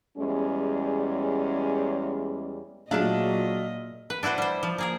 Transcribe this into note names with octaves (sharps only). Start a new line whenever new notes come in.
E2 G3 G#3 C#4
A#2 F#3 D4 F4 G#4 A4 D#5 E5
B4
D4 E4 F#4 B4 C5
G3 C5
F3
A#3 G#4 A#4